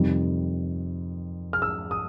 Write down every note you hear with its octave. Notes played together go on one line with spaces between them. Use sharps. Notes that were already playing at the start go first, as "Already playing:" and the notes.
Already playing: F2 C3 D#3 G3
F6
E6
D#6